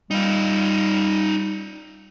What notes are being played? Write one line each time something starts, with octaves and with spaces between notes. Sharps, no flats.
G3 D#4 F4